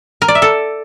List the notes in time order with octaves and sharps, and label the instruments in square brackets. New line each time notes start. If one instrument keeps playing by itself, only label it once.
[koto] A#4
D5
E5
A4